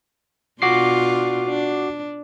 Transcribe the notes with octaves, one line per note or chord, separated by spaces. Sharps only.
B2 D4 F4 F#4 D6 C7
D4